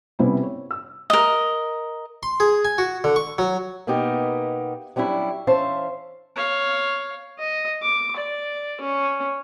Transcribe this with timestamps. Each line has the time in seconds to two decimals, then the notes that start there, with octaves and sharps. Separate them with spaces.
0.19 C3 G3 B3 C#4 E4 C5
0.43 C#5
0.71 E6
1.10 A#4 D#5
2.23 C6
2.40 G#4
2.65 G#5
2.78 F#4
3.04 D3
3.16 C#6
3.38 F#3
3.87 B2 A#3 B3 D#4 G4 A#4
4.96 F#3 G3 C#4 D4 E4
5.47 E3 C#4 C5 E5 F5 A5
6.36 C#5 F5
7.39 D#5
7.82 D6
8.16 D5
8.81 C#4